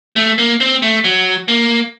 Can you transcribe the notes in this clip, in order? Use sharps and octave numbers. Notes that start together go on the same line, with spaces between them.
A3
A#3
C4
A3
F#3
A#3